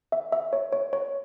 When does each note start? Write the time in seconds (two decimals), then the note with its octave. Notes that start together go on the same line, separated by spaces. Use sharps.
0.12 E5
0.32 E5
0.53 C#5
0.72 C#5
0.93 C#5